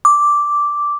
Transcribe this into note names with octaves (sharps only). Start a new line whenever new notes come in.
D6